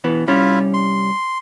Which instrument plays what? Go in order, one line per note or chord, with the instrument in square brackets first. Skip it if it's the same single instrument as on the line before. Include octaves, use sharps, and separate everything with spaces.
[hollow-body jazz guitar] B2 E3 B3
[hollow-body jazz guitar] C2 G3 C#4 [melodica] E4 F4 E5
[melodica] C6